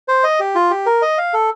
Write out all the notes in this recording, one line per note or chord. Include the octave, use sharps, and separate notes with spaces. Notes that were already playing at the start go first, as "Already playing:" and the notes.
C5
D#5
G4
F4
G4
A#4
D#5
F5
A4